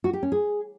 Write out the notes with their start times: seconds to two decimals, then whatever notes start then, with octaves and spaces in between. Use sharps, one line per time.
0.04 F#4
0.13 G4
0.23 C#4
0.32 G#4